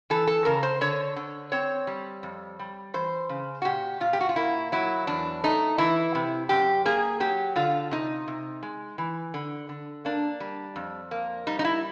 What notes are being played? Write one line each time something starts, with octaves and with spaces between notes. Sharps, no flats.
E3 A4
A4
C#3 A#4
C5
D3 C#5
D3
C4 C#5
G3
F2
G3
E3 C5
C#3
F#4
A#2 G4
A#2 F4
G4
F#4
F4
A#3 E4
F#3 E4
E2 D4
A3 D#4
E3 E4
C3
F#2 G4
A#3 G#4
F#3 G4
D3 F4
C3 D#4
C3
G#3
E3
D3
D3
A#3 D4
G3
F2
A#3
G3 D#4
D#4
E4